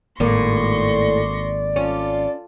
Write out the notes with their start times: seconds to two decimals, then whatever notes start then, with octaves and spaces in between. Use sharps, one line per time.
0.20 G#1 A2 A#3 D5 C6 C#6 A#6
1.76 C#4 F4 A4